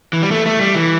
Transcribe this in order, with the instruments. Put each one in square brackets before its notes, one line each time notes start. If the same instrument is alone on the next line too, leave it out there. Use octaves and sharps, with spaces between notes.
[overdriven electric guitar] E3
G3
A3
A3
G3
E3